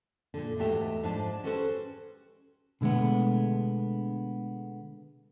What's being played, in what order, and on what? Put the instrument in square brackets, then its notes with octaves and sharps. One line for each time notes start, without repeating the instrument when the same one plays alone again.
[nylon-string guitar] A#2 D3
E2 G#2 A3 F#4 G4 E5
G#2 F3 D4 C5 D5 A5
C#4 F#4 G4 A4 B4 C5
[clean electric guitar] B2 D3 G#3 A3 B3